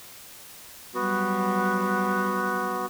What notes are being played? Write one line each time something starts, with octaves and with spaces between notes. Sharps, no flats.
F#3 G3 B3 F#4